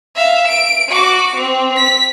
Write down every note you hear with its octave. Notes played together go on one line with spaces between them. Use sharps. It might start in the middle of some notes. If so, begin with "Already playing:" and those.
E5 F5
D7
F#4 D6
C4
B6